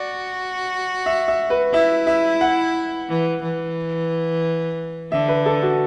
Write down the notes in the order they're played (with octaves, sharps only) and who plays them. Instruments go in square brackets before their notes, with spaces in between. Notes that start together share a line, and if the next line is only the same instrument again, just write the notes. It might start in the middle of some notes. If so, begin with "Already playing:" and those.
Already playing: [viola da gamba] F#4 [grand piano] D5
[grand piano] E5
E5
B4
[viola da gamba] E4 [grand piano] E5
[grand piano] E5
F#5
[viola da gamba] E3
E3
[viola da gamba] D3 [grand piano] E5
[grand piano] B4
A4
F#4